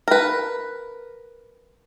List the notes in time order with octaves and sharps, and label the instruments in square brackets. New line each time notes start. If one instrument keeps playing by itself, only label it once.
[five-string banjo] A#4 B4